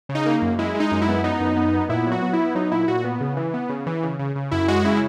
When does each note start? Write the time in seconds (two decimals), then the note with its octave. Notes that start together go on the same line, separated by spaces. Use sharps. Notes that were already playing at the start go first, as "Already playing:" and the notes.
0.09 C#3
0.15 D#4
0.26 A#3
0.42 F#2
0.59 G#3 E4
0.75 G#3
0.80 D#4
0.92 F#2
1.02 E4
1.08 B3
1.24 B3 D#4
1.40 F#2
1.57 B3
1.73 B3
1.89 A#2 E4
2.06 F#3
2.12 F#4
2.22 B3
2.33 E4
2.39 B3
2.55 F#3 D#4
2.72 A#2 E4
2.88 A#2 F#4
3.04 B3
3.21 C#3
3.37 E3
3.54 B3
3.69 C#3
3.86 E3
4.03 C#3
4.19 C#3
4.35 C#3
4.51 F#2 E4
4.68 G#3 F#4
4.85 C#3 E4